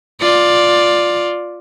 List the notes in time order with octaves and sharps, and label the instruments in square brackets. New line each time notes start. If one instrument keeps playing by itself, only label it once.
[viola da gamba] F4 D5